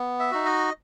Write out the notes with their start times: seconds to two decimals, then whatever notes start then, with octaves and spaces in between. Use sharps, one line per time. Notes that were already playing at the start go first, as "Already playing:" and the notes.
Already playing: B3
0.20 E5
0.31 D#4 F#4
0.45 D#5